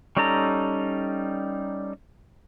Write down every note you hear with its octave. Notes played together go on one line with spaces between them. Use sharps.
G3 C#4 D#4 A4 A#5